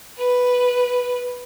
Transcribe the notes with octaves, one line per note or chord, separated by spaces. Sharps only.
B4